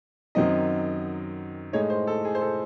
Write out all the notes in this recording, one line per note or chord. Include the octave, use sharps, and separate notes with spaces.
F#2 D#3 F#3 C4 D#4 D#5
A2 G#3 D#4 C#5
C5
A4
G#4
C5
A4